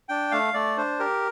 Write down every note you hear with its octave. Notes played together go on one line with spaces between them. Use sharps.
D4 G5
A3 F5
A3 D5
D4 C5
G4 A#4